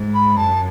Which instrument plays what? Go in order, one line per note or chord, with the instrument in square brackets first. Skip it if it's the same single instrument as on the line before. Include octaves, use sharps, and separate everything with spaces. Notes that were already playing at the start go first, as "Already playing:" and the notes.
Already playing: [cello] G#2
[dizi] B5
[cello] F#2 [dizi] A5